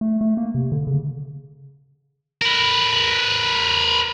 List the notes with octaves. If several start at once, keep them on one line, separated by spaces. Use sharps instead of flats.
A3
A3
A#3
C3
D3
C#3
A#4 B4